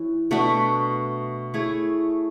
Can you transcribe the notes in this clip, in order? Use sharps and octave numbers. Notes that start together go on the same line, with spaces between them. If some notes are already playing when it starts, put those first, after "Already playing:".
Already playing: E3 C#4 E4
B2 A3 D4 F#4
A3 E4 G#4 C#5